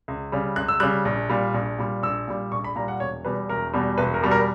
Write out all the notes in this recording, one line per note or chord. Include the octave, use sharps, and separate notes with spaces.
C#2
C#3 G3
C#2 F#6
E6
C#3 G3 F#6
A#1
A#2 G3
A#1
A#2 G3
A#1 E6
A#2 G3
A#1 C#6
B5
A#2 G3 A#5
F#5
E1 C#5
E2 B2 G3 B4
E1 A#4
E2 B2 G3
E1 B4
A#4
E2 B2 G3
A#4